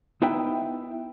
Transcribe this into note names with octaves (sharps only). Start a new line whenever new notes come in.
B3 D#4 E4 B4 E5 G5